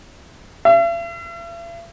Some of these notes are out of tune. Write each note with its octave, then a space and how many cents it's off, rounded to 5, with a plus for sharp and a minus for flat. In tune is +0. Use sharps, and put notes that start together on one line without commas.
E5 +45